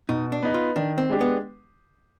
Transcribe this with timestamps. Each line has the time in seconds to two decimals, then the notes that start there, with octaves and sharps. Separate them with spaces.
0.09 B2 D#4
0.32 D4
0.43 B3 D#4 B4
0.54 F4
0.76 D#3 D4
0.98 C4
1.09 G#3 D4 G4
1.21 B3